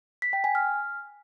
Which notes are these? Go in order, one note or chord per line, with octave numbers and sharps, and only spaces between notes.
B6
G5
G#5
F6